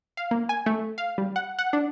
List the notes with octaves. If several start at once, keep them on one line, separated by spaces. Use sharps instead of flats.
F5
A#3
G#5
A3
F5
G3
F#5
F#5
D4